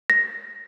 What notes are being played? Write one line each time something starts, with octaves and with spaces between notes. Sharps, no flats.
A#6